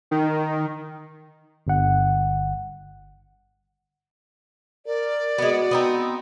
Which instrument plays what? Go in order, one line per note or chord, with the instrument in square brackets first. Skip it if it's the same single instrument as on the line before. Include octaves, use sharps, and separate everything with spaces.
[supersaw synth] D#3
[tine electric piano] G1 F#5
[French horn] A#4 [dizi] D5
[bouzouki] G#3 B3 [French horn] F#4
[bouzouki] B3 C4 D#4